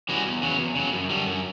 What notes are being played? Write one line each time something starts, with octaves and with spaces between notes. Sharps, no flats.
E3 G3 C#4 F#4
E2
C#3 F#3
E2
C#3 F#3
F#2
D3 G3
F#2